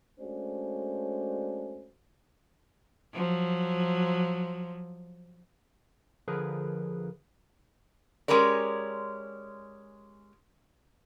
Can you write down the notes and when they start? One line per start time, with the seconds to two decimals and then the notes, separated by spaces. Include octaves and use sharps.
0.19 G#3 A3 C#4 D4 F#4 C5
3.13 F3 F#3
6.28 D3 F3 G#4 A#4 B4
8.28 G#3 C#4 G4 A#4 D5